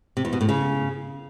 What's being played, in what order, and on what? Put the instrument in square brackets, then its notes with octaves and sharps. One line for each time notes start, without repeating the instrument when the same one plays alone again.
[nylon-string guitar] C3
E2
B2
A2
C#3